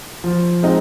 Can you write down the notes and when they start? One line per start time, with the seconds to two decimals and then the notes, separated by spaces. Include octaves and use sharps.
0.24 F3
0.63 G#3 C4 D#4